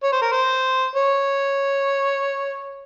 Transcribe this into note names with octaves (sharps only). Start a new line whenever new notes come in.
C#5
C5
A#4
C5
C#5